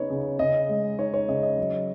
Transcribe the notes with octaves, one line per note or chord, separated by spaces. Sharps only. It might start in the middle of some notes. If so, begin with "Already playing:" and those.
Already playing: C#3 B3 D#4 C#5
C#3
C#3 D#5
G#3
D#4 C#5
C#5
C#3 D#5
D#5
F#3